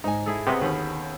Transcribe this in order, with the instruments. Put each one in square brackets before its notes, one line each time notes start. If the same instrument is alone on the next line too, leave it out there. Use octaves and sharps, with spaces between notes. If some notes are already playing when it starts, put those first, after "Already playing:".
[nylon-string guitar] G#2 G#5 [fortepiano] D#4
[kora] E4 G#4 A4
[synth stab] C3 [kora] B3 C#5 D#5 [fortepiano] B4
[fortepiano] D#2 [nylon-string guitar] D3 [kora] C#4 B4